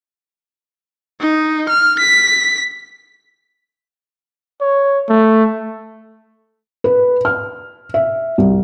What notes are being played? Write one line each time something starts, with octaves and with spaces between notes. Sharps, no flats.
D#4
F6
B6
C#5
A3
B4
F6
E5
C2